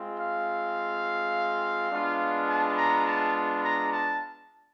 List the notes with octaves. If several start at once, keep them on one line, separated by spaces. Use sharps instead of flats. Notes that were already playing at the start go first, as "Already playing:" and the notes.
Already playing: G#3 C4 F4
F5
G#3 B3 D4 F4
A5
A#5
A5
A5
A#5
A5